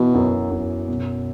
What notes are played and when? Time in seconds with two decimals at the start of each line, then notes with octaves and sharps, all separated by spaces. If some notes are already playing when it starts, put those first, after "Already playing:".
Already playing: B2 E3 B3
0.14 F#2
0.51 F#2
0.88 B2